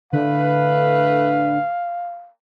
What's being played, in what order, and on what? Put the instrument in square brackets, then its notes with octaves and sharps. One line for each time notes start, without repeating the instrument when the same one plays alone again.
[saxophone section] A2 A3 B4 [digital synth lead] D3 [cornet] F5